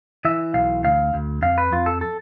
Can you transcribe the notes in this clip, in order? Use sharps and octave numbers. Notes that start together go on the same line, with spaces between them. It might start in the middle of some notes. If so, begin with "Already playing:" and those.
E3 E5
B1 F5
D2 F5
D2
F2 F5
B4
F2 F4
A4
A4